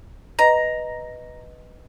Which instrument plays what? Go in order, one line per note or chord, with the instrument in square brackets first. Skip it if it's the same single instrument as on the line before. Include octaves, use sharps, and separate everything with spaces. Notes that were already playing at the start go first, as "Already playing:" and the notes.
[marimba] B4 D#5 [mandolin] A#5